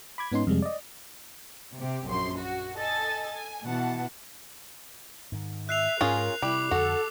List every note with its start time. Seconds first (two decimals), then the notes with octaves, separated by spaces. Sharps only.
0.18 B5 D6 G#6
0.32 G#2 B3 C#4 D#4 C6
0.47 F2 C3 G3 G#3
0.62 D5 D#5
1.78 C3 G4
2.06 A#1 F#2 C6
2.38 F#4
2.78 A4 D#5 G#5 A6
3.32 G#5
3.64 B2 E3 F#5 A5
5.32 G#2 D#3
5.69 E5 F#6 C7 F7
6.01 G#2 G#3 C#4 F4 G#4 A#4
6.42 C3 G3 E4 D6
6.71 F2 D3 F#4 A4